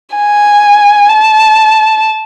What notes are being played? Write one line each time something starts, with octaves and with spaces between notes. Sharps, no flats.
G#5
A5